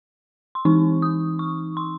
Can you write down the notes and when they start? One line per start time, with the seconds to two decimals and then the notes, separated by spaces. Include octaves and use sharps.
0.55 C6
0.65 E3 C4 D#4 C#6
1.02 D#6
1.39 C#6
1.77 C6